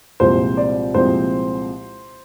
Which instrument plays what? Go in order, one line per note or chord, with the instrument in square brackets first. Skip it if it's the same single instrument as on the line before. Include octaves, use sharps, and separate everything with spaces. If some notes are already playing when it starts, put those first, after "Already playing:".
[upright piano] C2 A#2 F3 G#3 C4 C5
D5
C2 A#2 F3 G#3 C4 C5